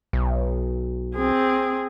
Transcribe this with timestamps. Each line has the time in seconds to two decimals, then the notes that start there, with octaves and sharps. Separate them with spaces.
0.13 B1
1.14 C4 G#4